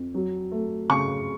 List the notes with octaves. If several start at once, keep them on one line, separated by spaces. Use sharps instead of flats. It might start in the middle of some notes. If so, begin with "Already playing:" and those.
Already playing: F2
F#3
A3
C#3 C#6